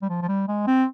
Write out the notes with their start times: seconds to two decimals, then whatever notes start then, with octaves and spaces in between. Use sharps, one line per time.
0.02 G3
0.10 F3
0.22 F3
0.28 G3
0.48 G#3
0.67 C4